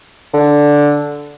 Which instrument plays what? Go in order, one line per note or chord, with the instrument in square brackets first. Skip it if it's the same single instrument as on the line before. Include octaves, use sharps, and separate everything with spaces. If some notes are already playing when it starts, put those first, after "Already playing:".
[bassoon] D3